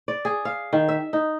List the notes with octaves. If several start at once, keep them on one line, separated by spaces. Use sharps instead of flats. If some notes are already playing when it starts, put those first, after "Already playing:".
D5
G#4
F5
D#3
E5
D#4